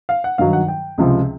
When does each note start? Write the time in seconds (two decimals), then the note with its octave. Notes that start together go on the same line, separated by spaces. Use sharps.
0.09 F5
0.24 F#5
0.38 G2 D#3 F#3 F5
0.53 F#5
0.68 G5
0.98 C#2 C3 F3